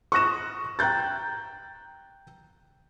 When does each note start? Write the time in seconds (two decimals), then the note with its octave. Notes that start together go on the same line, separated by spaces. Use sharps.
0.12 C#6 D#6 F#6 A#6 E7
0.79 G5 A#5 F#6 G6 A6